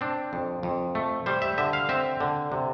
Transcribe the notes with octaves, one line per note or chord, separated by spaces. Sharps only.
C4 D4
F2
F2
A3
G3 C5
E5
D3 E5
F5
C4 E5
D3
C3